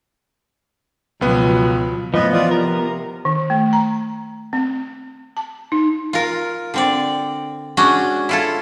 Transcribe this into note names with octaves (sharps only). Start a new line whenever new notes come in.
C#2 B2 F3 F#3 B3
F#2 A2 F3 B3 B4 D#5
E3 F4 D5 D#6
C3 A#4
D#3
A3
A#5
C4
A5
D#4
F4 A#4
D3 C4 D5
G#3 C#4 D4 F#4
E4 F4 A4